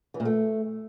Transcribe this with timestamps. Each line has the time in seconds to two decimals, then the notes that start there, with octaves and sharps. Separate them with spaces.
0.14 E3
0.20 A#2
0.25 A3